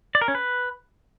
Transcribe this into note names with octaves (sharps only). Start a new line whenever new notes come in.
D5
A#4
C#4
B4